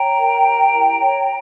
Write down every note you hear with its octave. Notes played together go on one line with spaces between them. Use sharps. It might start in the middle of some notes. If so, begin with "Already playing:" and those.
Already playing: C#5 G5 A#5
A#4
G4
E4
C#5